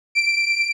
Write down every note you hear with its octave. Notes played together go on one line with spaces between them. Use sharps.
D7